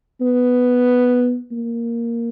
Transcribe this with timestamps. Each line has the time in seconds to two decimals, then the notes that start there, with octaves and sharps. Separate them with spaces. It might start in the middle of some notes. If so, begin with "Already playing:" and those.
0.21 B3
1.52 A#3